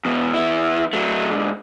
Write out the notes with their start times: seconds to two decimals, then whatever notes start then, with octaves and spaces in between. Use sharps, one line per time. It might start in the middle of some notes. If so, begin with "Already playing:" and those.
0.05 E2 B2
0.34 E2 E4
0.93 F#3 A3
1.30 G#2 D3